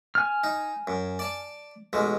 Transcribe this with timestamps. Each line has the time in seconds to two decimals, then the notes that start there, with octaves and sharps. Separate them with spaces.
0.15 G#5 F6
0.44 D#4
0.87 F#2
1.19 D5 A5
1.93 A1 B2 G#3